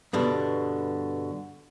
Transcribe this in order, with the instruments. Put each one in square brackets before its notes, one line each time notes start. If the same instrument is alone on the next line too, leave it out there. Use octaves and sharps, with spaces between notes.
[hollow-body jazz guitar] G2 B2 D3